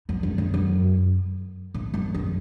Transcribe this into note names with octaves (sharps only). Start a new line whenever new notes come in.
F#2
F#2
F2
F#2
A2
F#2
F#2